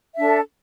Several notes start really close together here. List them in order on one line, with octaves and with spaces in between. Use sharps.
E5 D4 A4